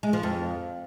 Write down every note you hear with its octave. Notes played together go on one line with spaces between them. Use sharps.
G#3
F3
F2